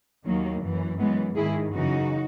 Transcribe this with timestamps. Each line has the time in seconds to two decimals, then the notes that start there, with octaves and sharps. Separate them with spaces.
0.26 D#2 D#3 F#3 A#3
0.63 F#2 E3
1.00 F#2 E3 G#3 B3
1.36 G#2 D#3 E4 G#4
1.73 F#2 C#3 E3 D#4 F#4